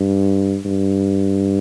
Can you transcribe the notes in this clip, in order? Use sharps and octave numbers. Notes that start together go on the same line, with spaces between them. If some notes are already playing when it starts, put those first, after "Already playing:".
Already playing: G2
G2